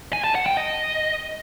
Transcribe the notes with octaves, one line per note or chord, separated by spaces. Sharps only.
G#5
A5
F#5
G5
D#5